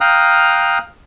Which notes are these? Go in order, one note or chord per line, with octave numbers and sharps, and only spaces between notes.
F5 G5 A#5 D#6 F6 F#6